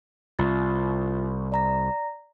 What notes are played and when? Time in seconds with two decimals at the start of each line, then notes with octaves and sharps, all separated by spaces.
0.39 C2 F4 A6
1.52 D5 A#5 A#6